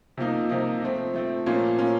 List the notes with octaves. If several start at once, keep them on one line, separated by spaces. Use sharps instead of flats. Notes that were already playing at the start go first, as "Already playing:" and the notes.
C3 F3 A#3 D#4
C3 F3 A#3 D#4
F3 A3 C4
F3 A3 C4
A#2 F3 A#3 C#4
A#2 F3 A#3 C#4